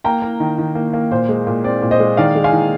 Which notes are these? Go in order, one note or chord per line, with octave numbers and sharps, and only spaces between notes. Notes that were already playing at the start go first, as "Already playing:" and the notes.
A#3 G5 A#5
A#3
D#3
D#3
A#3
A#3
A#2 C5
G#3
A#2
C4 D5
A#2
C5 D#5
G#3
D#3 D5 F5
G#3
F5 G#5
D#3